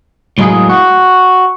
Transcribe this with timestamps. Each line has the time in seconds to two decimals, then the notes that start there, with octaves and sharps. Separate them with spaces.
0.38 A2 F#3 G#3 A#3 E4 G#4
0.69 F#4